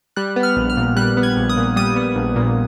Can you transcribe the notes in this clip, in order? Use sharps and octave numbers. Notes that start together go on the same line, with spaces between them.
G3 F#6
B3
F6
A#1
F6
A#2
G3 F#6
B3
G#6
A#1
D#6
A#2
G3 D#6
B3
A#1
A#2